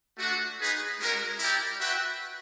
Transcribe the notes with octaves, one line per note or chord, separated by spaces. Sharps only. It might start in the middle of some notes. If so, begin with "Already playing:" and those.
A3 D4 F#4
D#4 G#4 B4
G#3 C#4 F#4 A#4
E4 G4 A#4 D5 G5
F#4 B4 E5 G5